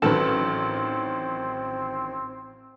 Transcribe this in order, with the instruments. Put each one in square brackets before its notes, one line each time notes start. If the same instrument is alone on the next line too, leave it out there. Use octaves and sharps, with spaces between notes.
[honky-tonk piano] A1 D#3 F#3 [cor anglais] C4 [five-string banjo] A4 B4